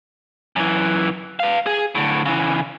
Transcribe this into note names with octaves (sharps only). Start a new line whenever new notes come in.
F#2 E3
B4 F5
G#4
A2 D3
C#3 E3